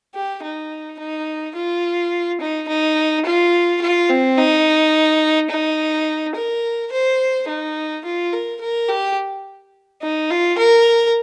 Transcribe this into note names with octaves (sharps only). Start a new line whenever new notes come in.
G4
D#4
D#4
F4
D#4
D#4
F4
F4
C4
D#4
D#4
A#4
C5
D#4
F4
A#4
A#4
G4
D#4
F4
A#4